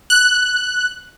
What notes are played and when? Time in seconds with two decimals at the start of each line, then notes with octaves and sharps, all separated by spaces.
0.10 F#6